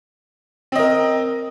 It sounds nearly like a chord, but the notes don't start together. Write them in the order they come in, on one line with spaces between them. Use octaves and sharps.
C4 D#5 A#4